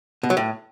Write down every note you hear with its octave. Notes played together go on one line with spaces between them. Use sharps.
B2
F#3
A2